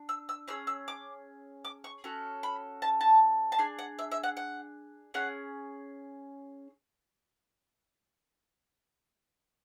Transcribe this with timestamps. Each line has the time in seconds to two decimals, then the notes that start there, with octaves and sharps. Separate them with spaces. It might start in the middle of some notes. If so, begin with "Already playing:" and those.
Already playing: D4
0.09 E6
0.29 E6
0.48 C#4 G#4 E6
0.67 E6
0.88 D6
1.65 D6
1.84 C#6
2.04 C#4 F#4 A4
2.43 B5
2.82 A5
3.01 A5
3.52 A5
3.58 D4 G#4 G#5
3.79 F#5
3.99 E5
4.12 E5
4.23 F#5
4.37 F#5
5.14 C#4 G#4 F#5